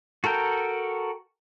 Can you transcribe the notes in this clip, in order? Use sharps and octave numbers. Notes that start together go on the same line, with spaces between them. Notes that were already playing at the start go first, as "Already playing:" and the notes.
F#4 A4 A#4 G5